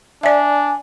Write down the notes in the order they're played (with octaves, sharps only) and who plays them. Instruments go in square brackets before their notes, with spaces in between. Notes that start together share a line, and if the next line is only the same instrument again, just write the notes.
[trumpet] D4 [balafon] D5 E5 [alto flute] G#5